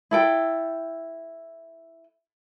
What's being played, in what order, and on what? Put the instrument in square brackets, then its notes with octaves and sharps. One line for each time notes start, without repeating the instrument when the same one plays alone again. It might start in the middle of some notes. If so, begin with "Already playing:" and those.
[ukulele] E4 A4 G5